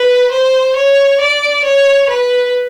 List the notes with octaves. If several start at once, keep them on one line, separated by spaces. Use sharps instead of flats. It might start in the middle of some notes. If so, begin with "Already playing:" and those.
Already playing: B4
C5
C#5
D5
C#5
B4